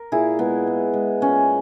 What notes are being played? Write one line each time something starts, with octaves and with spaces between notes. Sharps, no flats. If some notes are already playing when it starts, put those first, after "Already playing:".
Already playing: A#4
A#2 E4 G#4
G#3 B3
G#3
G#3
A#2 C#4